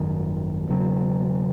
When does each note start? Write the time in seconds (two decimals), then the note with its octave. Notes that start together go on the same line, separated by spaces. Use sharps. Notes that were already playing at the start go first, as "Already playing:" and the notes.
Already playing: G#1 F#2 D#3
0.68 E1 E2 C#3 F#3